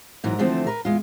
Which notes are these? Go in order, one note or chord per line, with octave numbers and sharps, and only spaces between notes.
G#2 E3 F#3 A#4
D3 E3 F3 A3 C4
A#4 B4
E2 G#3 F4